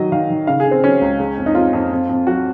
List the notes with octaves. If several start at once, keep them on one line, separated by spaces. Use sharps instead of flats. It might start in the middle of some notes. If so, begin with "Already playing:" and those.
Already playing: D#3 F#3 D#5
D#3 F5
D#3
C#3 F5
G#4
C#3
C4
F#3 C#4
C#2
G#3
F2
D#4
F2 F4
F2
F2
F2
F#3 F#4